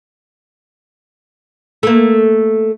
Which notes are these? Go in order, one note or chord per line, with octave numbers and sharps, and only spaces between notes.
A3 A#3